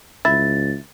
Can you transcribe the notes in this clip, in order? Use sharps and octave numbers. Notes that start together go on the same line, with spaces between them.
C#2 E4 A6